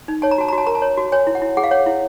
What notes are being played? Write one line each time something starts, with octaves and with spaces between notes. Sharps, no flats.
D#4
C#5 A5
A#5
F#4 A5
A#5
F#4
A5
A#4 A#5
A5
C#5
F#4
C#5 G#5
E4
F#5
E4
G#4 F#5
F5
C#5 F#5
E4